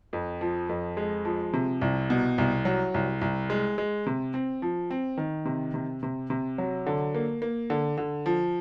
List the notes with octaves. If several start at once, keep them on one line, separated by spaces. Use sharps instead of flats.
F2
F3
F2
G#3
F3
C3
C2
B2
C2
F#3
C2
C2
G#3
G#3
C3
C4
F3
C4
D#3
C3
C3
C3
C3
F#3
D3
A#3
A#3
D3
D3
F3